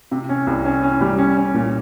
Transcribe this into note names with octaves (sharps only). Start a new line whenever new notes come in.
C3
C#4
C2
C#4
C#4
G3
C#4
C#4
A#2